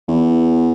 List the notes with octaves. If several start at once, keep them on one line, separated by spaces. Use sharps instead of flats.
E2